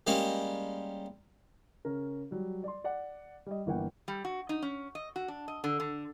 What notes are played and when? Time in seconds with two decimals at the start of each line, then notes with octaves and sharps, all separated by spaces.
0.07 G3 G#3 A#3 C#4
1.85 C#3 C#4 A#4
2.31 F#3 G3
2.64 D5 C6
2.84 D5 F#5
3.46 G3 D#5
3.66 G1 E3 A#3 F#5 G5
4.08 G3
4.25 F#4
4.49 D#4
4.62 C#4
4.95 D#5
5.16 F#4
5.28 D4
5.48 D#5
5.64 D3
5.80 D3